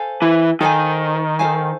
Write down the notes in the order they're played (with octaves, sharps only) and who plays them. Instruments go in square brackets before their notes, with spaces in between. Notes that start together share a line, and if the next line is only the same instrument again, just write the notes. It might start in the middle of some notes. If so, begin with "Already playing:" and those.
Already playing: [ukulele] A4 C5 F5 G#5
[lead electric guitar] E3
[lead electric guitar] D#3 [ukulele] A4 C5 F5 G#5
[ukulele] A4 C5 F5 G#5